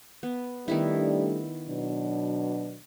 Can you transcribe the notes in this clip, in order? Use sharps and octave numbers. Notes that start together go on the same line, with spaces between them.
B3
D#3 G3 A3 B3 D4 E4
B2 F#3 D4